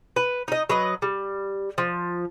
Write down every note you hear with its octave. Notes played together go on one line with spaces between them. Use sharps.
B4
D#4 D#5
F#3 B4 D#5
G3
F3